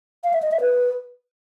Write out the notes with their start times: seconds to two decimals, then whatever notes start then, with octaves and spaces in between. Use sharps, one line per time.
0.24 F5
0.33 E5
0.42 D#5
0.52 E5
0.61 B4